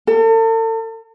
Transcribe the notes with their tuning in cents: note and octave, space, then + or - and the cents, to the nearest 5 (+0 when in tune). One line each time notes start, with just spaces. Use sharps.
A4 +40